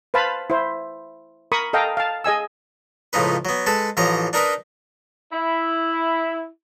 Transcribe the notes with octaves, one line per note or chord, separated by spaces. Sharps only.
B4 C5 F5 A5 B5
E4 C5
A#4 B5 C#6 D#6
A4 D#5 F5 G5 A#5
F5 A5
G#4 D#5 G#5 E6
C#2 A2 F3 D#4 B4
F#3 B3
G#3 A4 B4 A5
A1 E3 F3 C#5 D#5 A#5
D4 D#4 A#4 B4 D#5 B5
E4